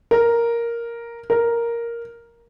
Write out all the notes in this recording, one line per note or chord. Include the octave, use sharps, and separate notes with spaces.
A#4
A#4